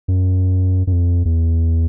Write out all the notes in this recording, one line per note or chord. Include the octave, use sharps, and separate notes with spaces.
F#2
F#2
F2
E2